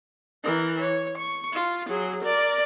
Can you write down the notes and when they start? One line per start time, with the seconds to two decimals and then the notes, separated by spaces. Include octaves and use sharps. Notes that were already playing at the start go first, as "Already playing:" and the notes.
0.44 E3 A#4
0.81 C#5
1.17 C#6
1.52 F4
1.89 F#3 G#4
2.22 A#4 D5